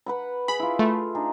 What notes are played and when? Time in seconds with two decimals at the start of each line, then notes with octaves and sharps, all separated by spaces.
0.06 B4 F#5 B5
0.48 G#4 B5
0.60 E4 F4
0.79 A3 F4
1.15 D4 D#4 G#4